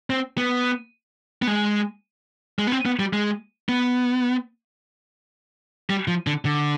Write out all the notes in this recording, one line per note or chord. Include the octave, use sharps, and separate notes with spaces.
C4
B3
B3
G#3
G#3
B3
C4
B3
G3
G#3
B3
G3
F3
D3
D3